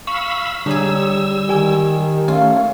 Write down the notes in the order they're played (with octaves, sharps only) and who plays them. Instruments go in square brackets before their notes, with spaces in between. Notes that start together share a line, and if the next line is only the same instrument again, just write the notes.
[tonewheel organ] F5 B5 E6 [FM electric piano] C#6
[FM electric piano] D3 [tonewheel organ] G3 E6 [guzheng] D#4 G#4 [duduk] C#5
[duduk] D#3 [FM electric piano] G4 G#5
[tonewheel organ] A3 C#4 [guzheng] F4